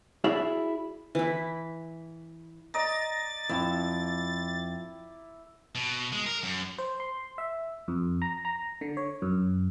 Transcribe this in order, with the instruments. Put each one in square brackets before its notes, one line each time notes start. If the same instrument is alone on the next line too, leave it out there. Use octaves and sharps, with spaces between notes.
[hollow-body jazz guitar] E4 F#4 G#4 D5 E5
[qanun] E3 E4
[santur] D5 D#5 A#5 [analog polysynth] A6
[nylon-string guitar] F2 [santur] E4
[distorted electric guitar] B2
G#3
A#4
F#2
[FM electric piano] C5
C6
E5
F2
A#5
A#5
D3
C#5
F#2